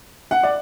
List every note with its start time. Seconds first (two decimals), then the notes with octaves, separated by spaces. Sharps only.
0.31 F#5
0.43 D5